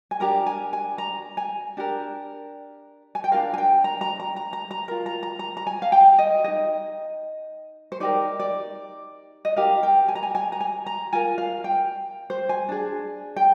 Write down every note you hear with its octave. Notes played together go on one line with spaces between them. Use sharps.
G#5
D4 G4 A#4 A#5
G#5
G#5
A#5
G#5
D4 G4 A#4
G#5
G5
D4 F4 A#4 F5
G#5
G5
A#5
A#5
A#5
A#5
A#5
A#5
F4 A#4 A#5
A#5
A#5
A#5
A#5
G#5
F5
G5
D#5
D#4 G#4 D#5
C5
D#4 G4 A#4 D5
D5
D#5
D#4 G4 A#4 F5
G5
G#5
A#5
G#5
G#5
A#5
G#5
A#5
F4 A#4 G#5
F5
G5
C5
G#5
D4 G#4
G5